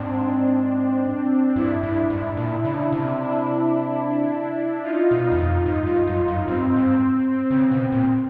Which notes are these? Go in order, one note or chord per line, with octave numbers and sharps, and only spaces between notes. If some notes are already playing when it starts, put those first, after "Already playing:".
Already playing: G#2 C4 D4
G2 D4 E4
G2
G#2
A#2
C#3
C3
D4 E4
D#4 F4
B2
E2
F2
G#2
G2
F#2
F#2
G2 C4
G#2
C4
C4
C#3
B2
A#2